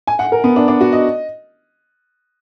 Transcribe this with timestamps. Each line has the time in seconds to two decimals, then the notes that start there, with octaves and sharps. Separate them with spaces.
0.07 G#5
0.19 F#5
0.32 A#4
0.44 B3
0.56 D4
0.68 D4
0.81 F#4
0.92 D#5